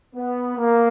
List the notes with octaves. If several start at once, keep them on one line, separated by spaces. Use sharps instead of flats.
B3
A#3